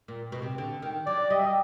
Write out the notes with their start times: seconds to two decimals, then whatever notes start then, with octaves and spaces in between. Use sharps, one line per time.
0.08 A#2
0.32 B2
0.42 C3
0.58 D3
0.82 D#3
1.06 F#3 D5
1.30 G3 D#5
1.38 E5
1.45 D#5